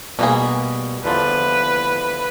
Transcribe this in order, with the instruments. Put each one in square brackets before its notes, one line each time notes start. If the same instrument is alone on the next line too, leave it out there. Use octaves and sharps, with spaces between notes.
[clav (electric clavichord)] B2 [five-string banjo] G3 A#3 G#4
[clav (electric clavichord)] E2 D3 F3 [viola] B4